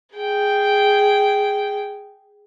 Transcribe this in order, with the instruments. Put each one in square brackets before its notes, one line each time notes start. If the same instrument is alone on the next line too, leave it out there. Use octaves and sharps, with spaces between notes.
[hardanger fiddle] G#4 G5